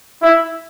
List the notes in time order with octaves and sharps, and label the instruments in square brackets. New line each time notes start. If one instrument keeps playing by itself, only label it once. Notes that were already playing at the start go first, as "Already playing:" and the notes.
[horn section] E4